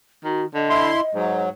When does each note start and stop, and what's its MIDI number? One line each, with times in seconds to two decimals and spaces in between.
0.24 0.44 51
0.24 0.46 66
0.54 0.91 50
0.54 1.42 75
0.69 1.01 64
0.69 1.01 84
1.15 1.49 44
1.15 1.49 54